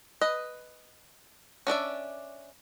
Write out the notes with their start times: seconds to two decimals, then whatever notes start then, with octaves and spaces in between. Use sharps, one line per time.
0.21 B4 D#5
1.67 C#4 D4 D5 E5